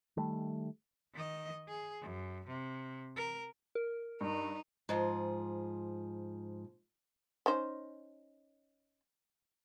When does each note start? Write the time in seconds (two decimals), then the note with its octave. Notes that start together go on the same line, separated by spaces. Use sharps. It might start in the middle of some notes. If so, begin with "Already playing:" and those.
0.17 D#3 G3 A3
1.14 D#3 D#5
1.68 G#4
2.01 F#2
2.47 C3
3.16 A#4
3.75 A#4
4.21 G2 D#4
4.89 G#2 F3 G#4
7.46 C#4 D#4 C5